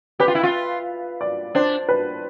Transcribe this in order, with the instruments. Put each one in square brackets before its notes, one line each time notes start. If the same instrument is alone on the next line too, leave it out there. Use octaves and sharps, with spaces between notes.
[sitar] G4 [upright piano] B4
[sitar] F4
E4
F4
[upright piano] D5
[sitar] D4 [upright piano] C5
[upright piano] B4